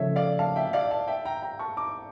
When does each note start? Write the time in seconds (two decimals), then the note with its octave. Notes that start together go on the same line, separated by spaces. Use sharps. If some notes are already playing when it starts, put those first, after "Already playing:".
Already playing: C#3 F3 A3 C#5 E5
0.16 D5 F5
0.39 F5 A5
0.56 E5 G5
0.73 D5 F5
0.91 F5 A5
1.08 E5 G5
1.25 G5 A#5
1.42 G5 A#5
1.59 A5 C#6
1.77 A#5 D6